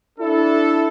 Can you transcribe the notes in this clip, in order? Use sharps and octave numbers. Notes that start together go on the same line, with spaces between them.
D4 E4 A4